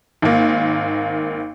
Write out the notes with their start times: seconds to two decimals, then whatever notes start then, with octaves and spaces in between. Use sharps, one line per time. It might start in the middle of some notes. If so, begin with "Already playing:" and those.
0.22 G#1 A#3